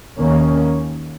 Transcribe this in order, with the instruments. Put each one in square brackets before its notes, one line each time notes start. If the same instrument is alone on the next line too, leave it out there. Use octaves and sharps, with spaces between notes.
[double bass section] D#2 D#3 A#3 C#4